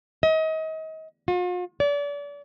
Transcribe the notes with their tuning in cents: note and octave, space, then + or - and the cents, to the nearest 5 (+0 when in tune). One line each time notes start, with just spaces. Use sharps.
D#5 +35
F4 +45
D5 -35